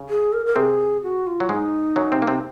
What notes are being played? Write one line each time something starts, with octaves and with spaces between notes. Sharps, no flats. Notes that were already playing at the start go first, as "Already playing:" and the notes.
Already playing: C#3
G#4
A#4
A#4
C3 C4 G#4
F#4
F4
F#3
G#2 G#3 D#4
F#2 F#3
C3 C4
A#3
C3 C4